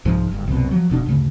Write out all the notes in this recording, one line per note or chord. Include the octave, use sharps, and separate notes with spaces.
C2 G#2 F3 G#3
F#1 G2
C2 F#2 B2
F3 F#3
F1 B2 C4 D4
D2 G2 C#3 A3